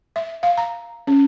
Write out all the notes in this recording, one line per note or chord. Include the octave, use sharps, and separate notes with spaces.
E5
F5
A#5
C#4